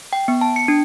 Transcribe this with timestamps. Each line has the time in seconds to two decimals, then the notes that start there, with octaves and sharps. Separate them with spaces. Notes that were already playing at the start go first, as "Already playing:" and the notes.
0.13 G5
0.28 B3
0.41 A5
0.56 C#7
0.68 D4